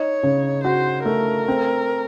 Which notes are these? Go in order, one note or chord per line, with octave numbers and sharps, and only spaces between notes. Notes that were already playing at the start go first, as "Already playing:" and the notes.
Already playing: D#4 C#5
C#3
F#4 C5
A3 A#4
C4